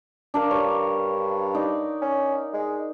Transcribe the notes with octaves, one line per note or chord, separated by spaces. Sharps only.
D4 A#4 F5
G2 C#5 D6
D#4 D5
C#4
G#3